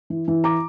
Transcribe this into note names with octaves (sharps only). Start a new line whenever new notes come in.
E3
E3
A#5 D6